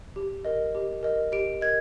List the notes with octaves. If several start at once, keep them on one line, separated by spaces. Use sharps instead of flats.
G4
A#4 D#5
G4
A#4 D#5
G4 D7
A#4 D#5 G#6